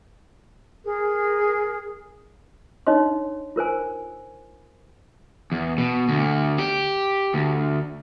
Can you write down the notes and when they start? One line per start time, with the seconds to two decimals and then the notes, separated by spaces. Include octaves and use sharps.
0.84 G#4 A#4
2.87 D4 D#4 C#5 D#5 C6
3.56 F4 A#4 C5 G#5
5.52 E2
5.78 B2
6.09 D2
6.59 G4
7.34 D2